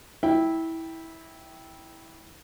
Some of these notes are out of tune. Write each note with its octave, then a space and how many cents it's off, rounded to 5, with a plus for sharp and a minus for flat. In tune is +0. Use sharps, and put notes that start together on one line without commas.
E4 -15 G5 +0